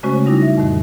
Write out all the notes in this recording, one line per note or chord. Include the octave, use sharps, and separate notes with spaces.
C#3 G#3 A3 C#4 F#4 C5
G3 D#4 E4 D6 A#6
E5
F2 A2 D#3